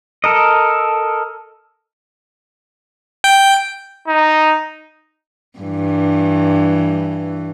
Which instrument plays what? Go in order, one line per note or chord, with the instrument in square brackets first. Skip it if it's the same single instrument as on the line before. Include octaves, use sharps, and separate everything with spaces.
[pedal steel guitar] A4 A#4 D#5
[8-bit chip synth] G5
[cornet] D#4
[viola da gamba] G2 E3